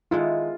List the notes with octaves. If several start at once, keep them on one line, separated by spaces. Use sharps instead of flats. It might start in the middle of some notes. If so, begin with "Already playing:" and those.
D#3 G#3 B3 E4 F4 A4